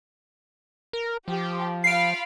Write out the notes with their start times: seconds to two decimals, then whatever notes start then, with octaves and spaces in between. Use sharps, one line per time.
0.93 A#4
1.28 F3 G4
1.84 F4 F5 B5 C7 D7